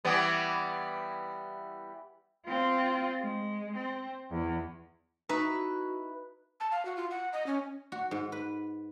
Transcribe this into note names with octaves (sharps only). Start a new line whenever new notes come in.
E3 G3 B3
C4 F4
G#3
C4
E2
D#4 E4 F#4 B4 C#6
A5
F5
F#4
F4
F#5
D#5
C#4
F#4
G#2
B4